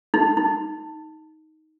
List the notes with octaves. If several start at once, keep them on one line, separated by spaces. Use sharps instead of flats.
D#4
D#4